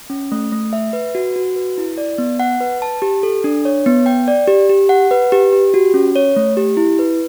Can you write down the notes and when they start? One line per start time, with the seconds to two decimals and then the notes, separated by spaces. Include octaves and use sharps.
0.10 C#4
0.32 A3
0.52 A3
0.73 E5
0.93 B4
1.15 F#4
1.36 F#4
1.56 B4
1.78 E4
1.98 D5
2.18 B3
2.40 F#5
2.61 B4
2.82 A5
3.02 G4
3.23 A4
3.44 D4
3.65 C#5
3.86 B3
4.06 G5
4.28 D5
4.48 G4
4.69 G4
4.89 F#5
5.11 B4
5.32 G4
5.53 G4
5.74 F#4
5.94 C#4
6.16 C#5
6.36 A3
6.57 G4
6.77 E4
6.99 B4